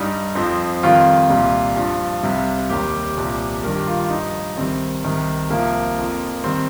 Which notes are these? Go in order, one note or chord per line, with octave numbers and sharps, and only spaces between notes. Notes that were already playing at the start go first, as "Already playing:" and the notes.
Already playing: G2 G3 D#4
F2 F3 C4
F2 D#3 G3 F4
C2 A#2 G3
G2 F3
C2 C3 G3
D#2 D#3 G3 G4
C2 A#2 F3
G2 D#3 G3 A#4
G4
F4
F4
G2 F3 D#4
C2 C3 D#3 G3 C4
C2 C3 D#3 G3
C2 C3 F3 A#3
F2 F3
D#3 G3 C4